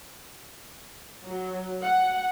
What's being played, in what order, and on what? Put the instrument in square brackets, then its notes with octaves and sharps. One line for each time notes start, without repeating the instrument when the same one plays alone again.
[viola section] F#3
F#5